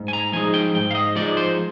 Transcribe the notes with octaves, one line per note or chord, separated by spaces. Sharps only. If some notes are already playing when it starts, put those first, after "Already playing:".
Already playing: G#2
G#5
A#5
F3 G#3 D#4 G#5
G5
G#2 G5
F5
D#5
F3 G#3 D#4 D5
C5